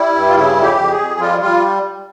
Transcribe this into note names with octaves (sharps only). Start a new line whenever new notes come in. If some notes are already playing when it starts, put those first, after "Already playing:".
Already playing: G3 E4
G2
F4
C#3 E4
F2
G4
F2
G#4
F2
G3 F4
G3 F4